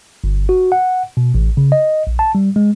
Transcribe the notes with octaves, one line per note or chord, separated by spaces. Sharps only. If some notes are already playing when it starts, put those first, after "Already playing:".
G1
F#4
F#5
B2
A1
C#3
D#5
A#1
A5
G3
G#3